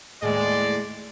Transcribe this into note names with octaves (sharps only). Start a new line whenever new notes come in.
D#2 A2 G#3 D5